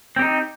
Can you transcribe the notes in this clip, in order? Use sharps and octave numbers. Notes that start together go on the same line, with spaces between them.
C4 D#4 G4